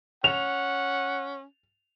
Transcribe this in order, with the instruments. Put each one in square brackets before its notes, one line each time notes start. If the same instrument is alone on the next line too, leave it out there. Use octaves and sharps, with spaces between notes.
[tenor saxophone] C#4 [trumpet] F#5 [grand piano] F7